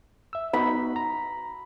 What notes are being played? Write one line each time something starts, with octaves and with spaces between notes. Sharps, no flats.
E5 E6
B3 D#4 F#4 B5
A#5